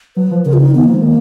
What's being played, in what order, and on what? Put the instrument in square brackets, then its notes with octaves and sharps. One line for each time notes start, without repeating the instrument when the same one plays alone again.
[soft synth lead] F#3 [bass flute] B4
[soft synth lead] F3
[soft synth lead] C#3 [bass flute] A#4
[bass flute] F4
D#4
[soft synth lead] D#3 [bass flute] B3
[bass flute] A#3
[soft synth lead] F3
[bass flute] G#3
[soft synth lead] D#3 [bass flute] A#3